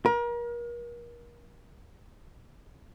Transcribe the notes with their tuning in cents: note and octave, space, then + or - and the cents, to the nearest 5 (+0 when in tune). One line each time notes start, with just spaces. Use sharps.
A#4 +35